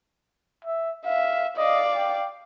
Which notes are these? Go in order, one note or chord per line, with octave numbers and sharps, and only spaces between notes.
E5
E5 F5
D5 D#5 F5
G5